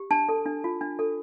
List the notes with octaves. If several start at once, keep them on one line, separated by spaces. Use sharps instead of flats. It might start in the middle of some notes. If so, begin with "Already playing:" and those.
Already playing: G4
D4 A5
A4
D4
F4
D4
A4